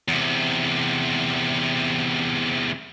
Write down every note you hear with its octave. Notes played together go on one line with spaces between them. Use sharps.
E2 C3